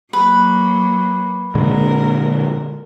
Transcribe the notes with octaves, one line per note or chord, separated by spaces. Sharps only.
F#3 A#3 B4
A#2 D3 G#3 A#4